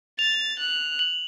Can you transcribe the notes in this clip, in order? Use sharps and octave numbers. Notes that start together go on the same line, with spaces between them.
A6 F7
F#6
F#7